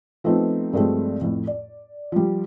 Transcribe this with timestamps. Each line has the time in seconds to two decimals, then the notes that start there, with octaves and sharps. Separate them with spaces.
0.24 F3 A3 B3 C4 D#4
0.73 G2 F3 G#3 A3 C4
1.21 F2 A2
1.47 D5
2.12 F3 G3